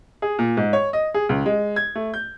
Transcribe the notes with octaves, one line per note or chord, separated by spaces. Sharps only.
G#4
A#2
G#2
C#5
D#5
G#4
C#2
G#3
G#6
A3
G6